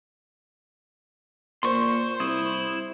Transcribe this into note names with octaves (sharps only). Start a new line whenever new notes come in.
A#2 C5 C6 C#6
C2 E4 D#6